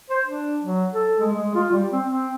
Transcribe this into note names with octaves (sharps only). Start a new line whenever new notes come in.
C5
D4
F#3
A4
G#3
G#3
F4
G3
C4
C4